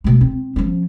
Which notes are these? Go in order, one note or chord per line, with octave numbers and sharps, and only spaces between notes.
B2 A3
C4
F3 C#4